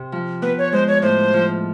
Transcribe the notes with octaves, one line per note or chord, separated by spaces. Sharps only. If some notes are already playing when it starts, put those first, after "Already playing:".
Already playing: C3
F3
B3 B4
C#5
G#3 C5
C#5
A2 C5
F3